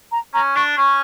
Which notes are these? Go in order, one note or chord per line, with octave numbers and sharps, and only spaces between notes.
A#5
C#4 A#5
D4 C#6
C#4 C#6